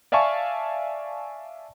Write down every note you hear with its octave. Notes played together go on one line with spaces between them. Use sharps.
D5 E5 F5 G#5 A5 C#6